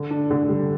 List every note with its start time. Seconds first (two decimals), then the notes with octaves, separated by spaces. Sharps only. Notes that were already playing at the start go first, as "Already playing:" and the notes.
Already playing: D3
0.11 D4
0.31 D3
0.49 G3